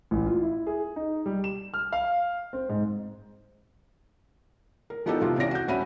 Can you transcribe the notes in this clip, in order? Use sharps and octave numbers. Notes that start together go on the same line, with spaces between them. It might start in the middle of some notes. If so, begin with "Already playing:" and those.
A1
F4
E4
G#4
D#4
G3
E7
F6
F5
C4
G#2
A#4
F3 B3 D#4 G4 A4
C3 F3 B3 F4
C3 E3 C#4 D5 A#6 D7
F#4 G6
D#1 C#4 F#4 E5 B5 D#7